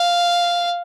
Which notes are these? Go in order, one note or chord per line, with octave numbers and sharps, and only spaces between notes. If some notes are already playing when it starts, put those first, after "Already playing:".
Already playing: F5